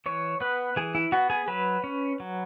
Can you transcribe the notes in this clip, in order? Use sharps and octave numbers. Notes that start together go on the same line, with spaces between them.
E3 C#5
B3 B4
E3 G#4
E4
B3 F#4
G#4
F#3 B4
C#4
F#3